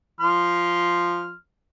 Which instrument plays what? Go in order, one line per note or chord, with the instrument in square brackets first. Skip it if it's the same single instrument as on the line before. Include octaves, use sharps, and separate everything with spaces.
[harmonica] F3 C6 F6